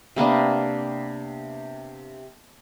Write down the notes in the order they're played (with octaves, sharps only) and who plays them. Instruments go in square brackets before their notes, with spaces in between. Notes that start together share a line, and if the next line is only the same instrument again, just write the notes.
[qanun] C3 A#3 B3 D4